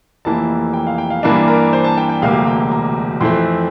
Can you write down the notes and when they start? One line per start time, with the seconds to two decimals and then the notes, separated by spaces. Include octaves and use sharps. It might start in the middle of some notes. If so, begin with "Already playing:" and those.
0.25 F1 F2 E3 A#3 A5
0.73 G5
0.87 F5
0.98 G5
1.10 F5
1.23 G2 E3 A#3 D4
1.48 A#4
1.73 C5
1.84 A5
1.97 G5
2.09 G5
2.22 E1 D2 C3 G3 A#3 F5
2.47 G5
2.72 A#5
3.21 F2 E3 A3 C4 C6